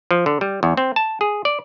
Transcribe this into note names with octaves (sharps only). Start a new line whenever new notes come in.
F3
D3
G3
E2
C4
A5
G#4
D5